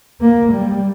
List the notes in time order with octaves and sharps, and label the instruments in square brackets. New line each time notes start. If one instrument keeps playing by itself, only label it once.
[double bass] A#3
G3